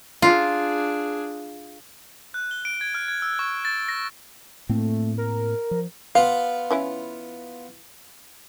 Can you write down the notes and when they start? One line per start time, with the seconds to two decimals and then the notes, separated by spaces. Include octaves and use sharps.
0.22 D4 F4 G#4
2.34 F#6
2.51 G7
2.65 D7
2.81 G#6
2.95 F6
3.08 G#6
3.22 E6
3.39 C#6
3.65 A6
3.88 A#6
4.69 A2 A3 A#3 C4
5.18 A#4
5.71 F3
6.15 B3 F4 F5
6.70 E3 C#4 E4